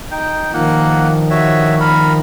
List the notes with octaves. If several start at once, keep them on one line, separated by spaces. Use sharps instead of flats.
D#4 G5
D#3 F3 A#3 F#5
F#4 C#5 E5
A#4 B5